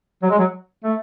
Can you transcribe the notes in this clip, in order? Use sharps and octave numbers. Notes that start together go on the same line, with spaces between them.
F#3
G#3
F#3
A3